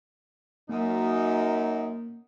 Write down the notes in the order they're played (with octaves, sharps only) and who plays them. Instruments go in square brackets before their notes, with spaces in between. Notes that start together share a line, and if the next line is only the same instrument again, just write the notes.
[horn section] F#2 D#4 [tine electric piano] A#3